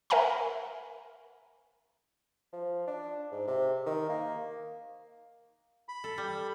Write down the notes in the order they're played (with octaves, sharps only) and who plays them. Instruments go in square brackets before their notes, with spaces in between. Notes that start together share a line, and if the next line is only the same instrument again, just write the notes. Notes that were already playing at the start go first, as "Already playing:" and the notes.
[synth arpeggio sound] A#4 E5 F#5 G#5 A#5 B5
[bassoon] F3
D4
G#2
C3
D#3
A#3
[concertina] B5
[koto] A4
G3